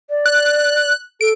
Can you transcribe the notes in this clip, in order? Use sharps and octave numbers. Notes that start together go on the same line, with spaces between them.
D5
F#6
A4 D7